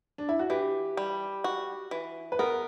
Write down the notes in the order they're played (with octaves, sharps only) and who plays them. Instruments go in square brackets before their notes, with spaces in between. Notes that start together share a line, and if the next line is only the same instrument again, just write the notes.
[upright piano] D4
E4
F#4
[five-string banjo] E3 [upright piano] G4
[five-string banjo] G3
F#4
E3
[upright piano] B4
[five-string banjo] B3 [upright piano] A#4